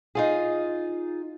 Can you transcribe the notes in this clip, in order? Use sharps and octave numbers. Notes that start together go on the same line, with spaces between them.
D#4 F4 G#4